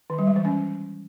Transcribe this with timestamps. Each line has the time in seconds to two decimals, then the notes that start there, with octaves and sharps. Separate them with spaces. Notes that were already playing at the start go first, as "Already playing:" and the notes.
0.10 D#3
0.19 G3
0.27 G#3
0.36 E3
0.45 C#4